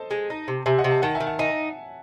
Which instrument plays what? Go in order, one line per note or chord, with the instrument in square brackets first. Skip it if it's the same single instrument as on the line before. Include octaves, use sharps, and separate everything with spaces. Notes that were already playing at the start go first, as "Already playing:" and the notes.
Already playing: [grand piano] A4 C5 D#5 A5
[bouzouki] G#3
D#4
C3
[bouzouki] C3 [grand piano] E5 G#5
[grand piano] D#5 F#5
[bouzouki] C3
[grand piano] F#5 A5
[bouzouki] D#3 [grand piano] F#5 A5
[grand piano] E5 G#5
[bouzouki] D#3
[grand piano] F#5 A5
[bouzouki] D#4 [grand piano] E5 G#5